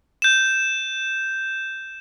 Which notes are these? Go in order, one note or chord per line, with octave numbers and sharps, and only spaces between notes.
G6 E7